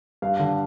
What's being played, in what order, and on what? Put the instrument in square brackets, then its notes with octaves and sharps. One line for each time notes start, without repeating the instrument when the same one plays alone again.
[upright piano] G2 F5
D3